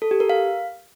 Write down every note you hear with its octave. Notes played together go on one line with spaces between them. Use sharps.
A4
G4
A#4
F5